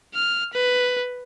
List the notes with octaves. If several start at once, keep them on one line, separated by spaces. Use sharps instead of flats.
F6
B4